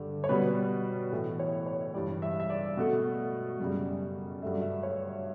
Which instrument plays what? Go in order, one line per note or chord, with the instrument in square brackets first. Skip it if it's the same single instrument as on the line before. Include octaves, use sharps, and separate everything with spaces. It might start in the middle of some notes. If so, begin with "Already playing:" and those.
Already playing: [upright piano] G2 D3 G4
C#5
B2 G3 B4
A2 E3 A3
C#5
D5
C#5
G2 E3 G3 D5
E5
E5
D5
B2 A3
F#2 C#3 G3
G2 F#3 A3 E5
D5
E5
C#5